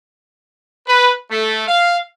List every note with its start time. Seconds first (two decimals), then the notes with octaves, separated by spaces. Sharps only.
0.87 B4
1.31 A3
1.66 F5